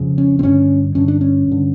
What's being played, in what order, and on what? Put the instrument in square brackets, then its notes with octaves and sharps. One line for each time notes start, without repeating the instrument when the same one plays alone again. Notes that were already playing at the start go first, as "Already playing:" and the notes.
Already playing: [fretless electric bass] F2 C#3
C#4
C4
G2 D3 C#4
G2 D3 C#4
D4
C#4
G2 D3